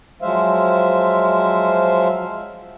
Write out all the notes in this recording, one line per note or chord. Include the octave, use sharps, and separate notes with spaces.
F3 F#3 G#3 C5 E5 F5